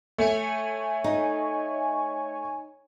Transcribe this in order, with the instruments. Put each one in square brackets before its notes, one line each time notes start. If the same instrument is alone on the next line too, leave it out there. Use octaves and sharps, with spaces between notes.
[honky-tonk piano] A3 [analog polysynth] C#5 G#5
[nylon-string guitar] D#4